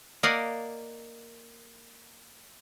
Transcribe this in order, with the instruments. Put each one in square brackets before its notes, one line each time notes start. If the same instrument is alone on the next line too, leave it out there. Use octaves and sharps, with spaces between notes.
[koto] A#3 A#4 D5 D#5 F5 F#5